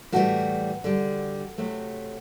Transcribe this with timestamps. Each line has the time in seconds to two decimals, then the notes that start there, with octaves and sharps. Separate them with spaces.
0.12 A2 E3 G3 F#4
0.84 D3 G3
1.58 C3 F#3 A3